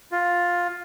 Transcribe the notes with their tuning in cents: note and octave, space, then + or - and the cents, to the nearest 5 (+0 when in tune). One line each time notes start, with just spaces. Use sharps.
F4 +10